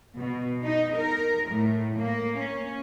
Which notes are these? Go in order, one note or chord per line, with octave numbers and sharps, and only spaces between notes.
B2
D#4
A#4
A2
A#3
C#4